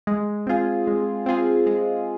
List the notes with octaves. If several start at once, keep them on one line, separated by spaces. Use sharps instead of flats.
G#3
C4 F4 G#4
G#3
C4 F4 G#4
G#3